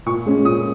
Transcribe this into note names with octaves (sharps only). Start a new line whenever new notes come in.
A#2 C#6
G#3 C#4
A#2 D#6